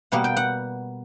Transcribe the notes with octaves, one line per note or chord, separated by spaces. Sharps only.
B2 G3 A#3 F#5
G5
F#5